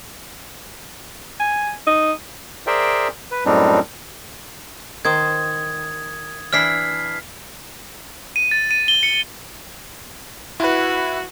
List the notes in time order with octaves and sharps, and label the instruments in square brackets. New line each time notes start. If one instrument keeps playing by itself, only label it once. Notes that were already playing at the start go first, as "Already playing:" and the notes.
[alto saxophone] G#5
D#4
[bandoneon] G#4 A#4 C5 D5 E5 G5
B4
F#2 A2 G3 C4 D4 D#4
[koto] D#3 C5 [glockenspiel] D#6 G#6
[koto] E3 D4 E4 [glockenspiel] F6 B6 C7
[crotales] D#7
A6
D#7
G7
C#7
[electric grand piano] E4 B4 [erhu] F#4